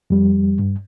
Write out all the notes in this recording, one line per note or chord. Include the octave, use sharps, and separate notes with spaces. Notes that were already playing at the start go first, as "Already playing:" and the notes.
F2 G3
G2